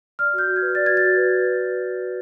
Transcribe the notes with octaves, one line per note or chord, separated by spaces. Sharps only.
D5 F6
F#4
G6
F#4
G#6
B4
D5 A6
F#4 G#6
A6
F#4
B4